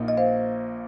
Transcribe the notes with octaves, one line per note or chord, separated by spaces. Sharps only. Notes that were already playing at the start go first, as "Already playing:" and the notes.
Already playing: A#1 A#2 A#3 D#4
D#5
C5 F5